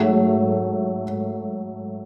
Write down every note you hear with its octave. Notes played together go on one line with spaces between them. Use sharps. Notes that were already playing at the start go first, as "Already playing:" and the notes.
Already playing: G#2 F#3 A3